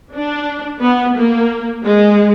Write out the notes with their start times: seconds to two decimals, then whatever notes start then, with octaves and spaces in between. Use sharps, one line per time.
0.14 D4
0.82 B3
1.16 A#3
1.84 G#3